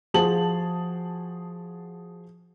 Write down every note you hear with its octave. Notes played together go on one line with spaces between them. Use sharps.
F3 F#4 G#4 A5 F#7